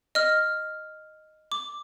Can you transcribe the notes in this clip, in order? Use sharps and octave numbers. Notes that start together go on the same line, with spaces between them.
D#5 F6
D6